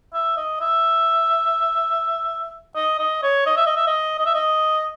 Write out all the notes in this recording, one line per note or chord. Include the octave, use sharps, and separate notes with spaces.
E5
D#5
E5
D#5
D#5
C#5
D#5
E5
D#5
E5
D#5
D#5
E5
D#5